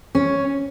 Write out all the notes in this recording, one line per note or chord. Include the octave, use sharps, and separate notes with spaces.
C#4